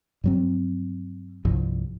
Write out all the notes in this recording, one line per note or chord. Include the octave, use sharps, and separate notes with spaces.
G2 F#3 C4
C2 G2 F3